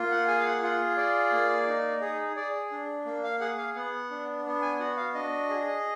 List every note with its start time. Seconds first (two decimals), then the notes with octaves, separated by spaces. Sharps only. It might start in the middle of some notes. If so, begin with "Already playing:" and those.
Already playing: A#3 F4
0.11 F#5
0.28 G#4 G#5
0.39 F5
0.45 F#5
0.63 F4 F#5
0.97 G#4 D5
1.33 A#3
1.68 D#4
2.02 G#4
2.36 G#4 D5
2.72 D4
3.06 A#3
3.23 F5
3.40 G#4 F#5
3.58 F5
3.75 B3 F#5
4.11 D4
4.45 B3
4.62 G#5
4.80 F#4 F#5
4.97 F5
5.14 D4 D#5
5.50 G#4